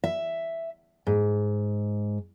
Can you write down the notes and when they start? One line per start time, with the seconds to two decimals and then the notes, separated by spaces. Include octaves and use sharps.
0.04 E5
1.07 G#2